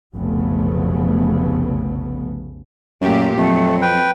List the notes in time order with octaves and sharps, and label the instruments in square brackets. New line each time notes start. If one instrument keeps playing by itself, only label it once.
[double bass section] F1 B1 C#3 A3 B3
[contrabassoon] F#2 [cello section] A#2 A3 G4
[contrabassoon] F2 [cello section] F#3 [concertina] A3 [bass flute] C4
[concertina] B4 G5